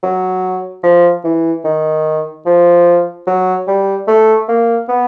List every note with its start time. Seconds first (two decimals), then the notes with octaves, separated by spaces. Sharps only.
0.03 F#3
0.83 F3
1.24 E3
1.65 D#3
2.46 F3
3.27 F#3
3.68 G3
4.08 A3
4.48 A#3
4.89 B3